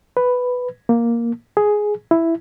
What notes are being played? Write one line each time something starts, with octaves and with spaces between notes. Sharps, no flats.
B4
A#3
G#4
E4